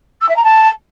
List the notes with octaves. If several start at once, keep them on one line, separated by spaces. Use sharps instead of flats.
E6
E5
A#5
A5